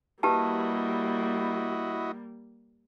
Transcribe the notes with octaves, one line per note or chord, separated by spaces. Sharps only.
G3 A#3 E4 F#4 G4 B4 D#5 A5